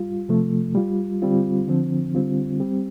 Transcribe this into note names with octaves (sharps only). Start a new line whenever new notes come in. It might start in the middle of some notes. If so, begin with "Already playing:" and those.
Already playing: G3 F4
C3 F3 A3
G3 F4
D3 G3 C4 F4
D3 F3 C4
D3 G3 C4 F4
G3 C4 G4